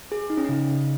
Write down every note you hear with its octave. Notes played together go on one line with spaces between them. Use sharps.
G#4
D#4
C#4
C#3 D#4